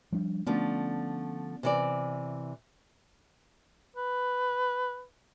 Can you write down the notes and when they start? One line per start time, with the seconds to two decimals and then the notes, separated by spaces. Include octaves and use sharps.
0.12 F3 G3 D4
0.46 D3 F3 A3 B3 C#4
1.63 C3 E3 D5
3.96 B4